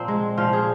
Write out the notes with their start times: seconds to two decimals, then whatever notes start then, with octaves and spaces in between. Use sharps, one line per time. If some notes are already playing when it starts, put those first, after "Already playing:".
Already playing: A#2 F3 A#3 C4
0.08 G#3
0.37 A#2 F3 F4
0.53 G#4